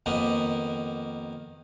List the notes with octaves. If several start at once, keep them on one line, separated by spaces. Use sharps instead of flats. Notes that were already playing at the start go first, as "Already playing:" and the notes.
F2 D#3 A#3 B3